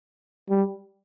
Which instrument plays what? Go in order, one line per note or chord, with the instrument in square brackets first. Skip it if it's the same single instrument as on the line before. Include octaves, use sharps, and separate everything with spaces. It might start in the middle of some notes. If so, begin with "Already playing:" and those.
[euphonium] G3